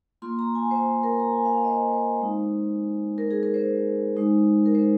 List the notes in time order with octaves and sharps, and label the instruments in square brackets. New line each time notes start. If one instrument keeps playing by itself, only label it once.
[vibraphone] A#3 F4 C6
A#5
G#5
C5
A#4
A#5
G#5
F5
F5
D#5
C5
C5
G#3 C4 D#4
A#4
G#4
A#4
C5
G#3 D#4
A#4
C5